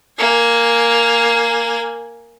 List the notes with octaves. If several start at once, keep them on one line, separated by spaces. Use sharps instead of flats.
A#3 G#5